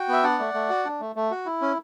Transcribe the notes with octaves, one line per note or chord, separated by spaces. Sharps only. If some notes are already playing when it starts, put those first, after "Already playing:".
Already playing: F#4 G5
B3 E5
D4 D5 F#5
A3
A3
F#4
D4
A3
A3
F#4
E4
C#4